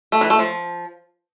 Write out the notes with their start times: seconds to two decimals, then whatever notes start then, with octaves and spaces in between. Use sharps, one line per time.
0.12 A3
0.21 E3
0.30 A3
0.39 F3